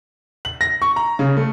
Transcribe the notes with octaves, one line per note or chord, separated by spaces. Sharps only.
F#7
A#6
C#6
A#5
C#3
A3